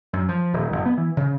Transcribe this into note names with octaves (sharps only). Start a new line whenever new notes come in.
F#2
F3
D#1
F#1
B3
E3
C#3